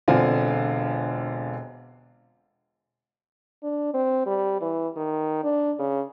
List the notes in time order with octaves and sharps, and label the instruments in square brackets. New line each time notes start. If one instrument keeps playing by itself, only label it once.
[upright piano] E1 D3 C4 F4 F5 G#5
[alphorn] D4
C4
G3
E3
D#3
D4
C#3